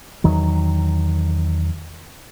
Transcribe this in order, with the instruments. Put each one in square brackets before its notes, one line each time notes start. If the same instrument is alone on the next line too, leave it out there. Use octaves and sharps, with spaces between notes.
[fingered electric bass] E2 D#3 F#3